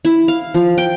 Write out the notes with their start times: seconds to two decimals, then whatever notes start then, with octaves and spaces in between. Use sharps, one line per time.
0.05 E4
0.28 F5
0.54 F3
0.78 G5